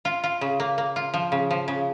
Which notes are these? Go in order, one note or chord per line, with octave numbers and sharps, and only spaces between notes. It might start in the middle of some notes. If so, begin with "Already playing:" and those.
F4
F4
C#3
A#3
A#3
F4
F3
C#3
F3
C#3